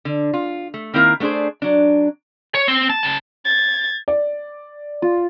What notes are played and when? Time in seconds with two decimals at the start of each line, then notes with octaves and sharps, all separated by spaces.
0.05 D3
0.34 F4
0.74 A3
0.94 D#3 A#3 C4 E4 A#4 F5
1.20 A3 B3 D4 G#4 C5
1.62 F#3 D4
2.55 C#5
2.68 C4
2.90 A5
3.03 C#3 A5
3.45 G#6 A6
4.08 D5
5.02 F4